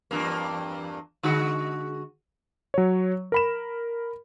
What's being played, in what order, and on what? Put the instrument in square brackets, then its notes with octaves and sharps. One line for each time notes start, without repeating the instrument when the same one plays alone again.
[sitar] E2 G2 A#3
D3 G#3 F#4
[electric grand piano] F#3 C#5
A#4 B5 E7